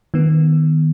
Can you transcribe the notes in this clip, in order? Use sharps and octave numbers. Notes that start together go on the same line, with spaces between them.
D#3 B3